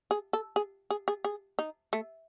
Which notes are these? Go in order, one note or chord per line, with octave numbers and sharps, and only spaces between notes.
G#4
A4
G#4
G#4
G#4
G#4
D#4
A3